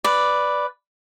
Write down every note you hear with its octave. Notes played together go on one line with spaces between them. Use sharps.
B4 D5